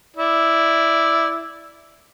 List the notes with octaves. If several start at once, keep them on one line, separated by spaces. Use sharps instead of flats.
E4 D5